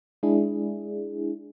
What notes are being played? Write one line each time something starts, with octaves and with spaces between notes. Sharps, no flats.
G#3 D4 E4 G#4